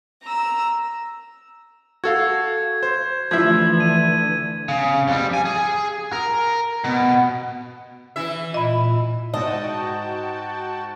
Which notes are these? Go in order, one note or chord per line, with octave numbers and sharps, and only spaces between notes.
A#5 E6
F#4 A4 F5 G#6
C5
D3 E3 F3 A3 E4 G#6
D#7
C#3
F2 G3
G#5
G#4
A#4
B2
E3 E4 E5
A#2 D#5 B5
G#2 F#4 D#5 G5 A5